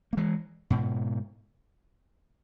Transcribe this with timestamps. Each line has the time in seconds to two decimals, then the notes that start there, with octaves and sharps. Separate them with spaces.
0.13 A#3
0.17 E3 G#3
0.70 G#2 B2